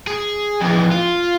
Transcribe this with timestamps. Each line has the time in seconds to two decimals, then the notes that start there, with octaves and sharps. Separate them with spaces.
0.07 G#4
0.61 F2 E3
0.91 F4